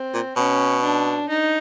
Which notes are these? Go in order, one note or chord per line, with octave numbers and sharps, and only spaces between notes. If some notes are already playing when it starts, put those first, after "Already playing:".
Already playing: C4
A#2
B2 C#4
D4
D#4